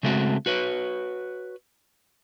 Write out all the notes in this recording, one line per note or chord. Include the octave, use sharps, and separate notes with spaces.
C#3 G#3 A3 C4 F#4
F#4 B4 C#5